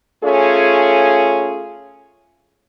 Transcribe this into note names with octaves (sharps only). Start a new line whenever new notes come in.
A3 C#4 F4 G#4 C#5